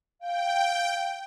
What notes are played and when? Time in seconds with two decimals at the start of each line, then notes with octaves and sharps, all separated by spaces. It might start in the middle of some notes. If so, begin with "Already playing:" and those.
0.21 F5 G5